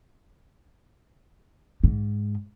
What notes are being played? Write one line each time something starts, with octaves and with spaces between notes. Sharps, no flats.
G#2